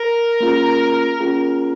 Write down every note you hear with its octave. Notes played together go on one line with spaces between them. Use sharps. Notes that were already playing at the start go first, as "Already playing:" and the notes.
Already playing: A#4
A#3 C#4 F4 G#4
A#3 C#4 F4 G#4